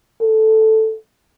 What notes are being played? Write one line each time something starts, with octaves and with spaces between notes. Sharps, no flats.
A4